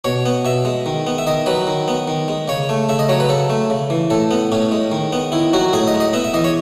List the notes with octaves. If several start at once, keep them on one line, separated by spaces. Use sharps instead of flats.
B2 C#5
B3
B2 E5
G#3
D#3
B3
E5
D#3 D#5
F#3 B4
D#3
B3
D#3
G#3
C#3 C#5
A3
C#3 E5
D#5
F#3 C#5
B4
C#3 A4
A3
C#3
E3
A2 A4
B3
A2 C#4
G#3
D#3
B3
D#3 E4
F#3 F#4
A2 G#4
D#5
G#3
D#5
B3 E5
E5
E3 D#5
C#5